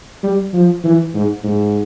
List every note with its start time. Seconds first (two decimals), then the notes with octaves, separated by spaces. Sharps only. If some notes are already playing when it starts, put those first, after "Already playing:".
0.23 G3
0.53 F3
0.84 E3
1.14 G#2
1.43 G#2